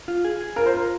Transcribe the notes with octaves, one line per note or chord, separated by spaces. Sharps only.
F4
G#4
G#4
F4 A#4
C5
A#4